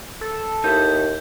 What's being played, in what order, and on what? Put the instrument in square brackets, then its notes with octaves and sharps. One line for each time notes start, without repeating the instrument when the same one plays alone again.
[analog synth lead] A4
[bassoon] D#2 [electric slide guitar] D#4 E4 [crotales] G6